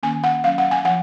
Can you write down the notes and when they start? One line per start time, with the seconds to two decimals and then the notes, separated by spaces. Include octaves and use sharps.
0.03 D#3 A#3 C#4 G#5
0.24 F#5
0.44 F#3 A#3 C#4 F5
0.58 F#5
0.71 G#5
0.85 F3 F#5